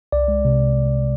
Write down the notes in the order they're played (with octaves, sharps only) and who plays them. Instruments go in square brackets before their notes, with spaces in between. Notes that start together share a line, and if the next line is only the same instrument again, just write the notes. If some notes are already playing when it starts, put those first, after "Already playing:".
[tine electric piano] C2 D5
G#3
C3